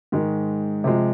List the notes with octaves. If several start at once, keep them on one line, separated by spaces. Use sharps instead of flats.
G#2 D#3 G#3
C3 F3 G#3